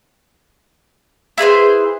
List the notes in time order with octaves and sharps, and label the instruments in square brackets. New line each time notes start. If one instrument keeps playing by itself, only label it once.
[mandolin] E4 G#4 B4 C5